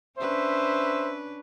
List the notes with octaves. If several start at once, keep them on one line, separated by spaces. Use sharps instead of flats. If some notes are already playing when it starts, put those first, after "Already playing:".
C#4 D4 B4 C5 E5